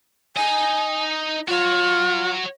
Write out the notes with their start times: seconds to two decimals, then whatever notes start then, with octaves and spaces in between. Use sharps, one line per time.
0.37 D#4 D#5 G#5
1.48 F4 F#4 C#5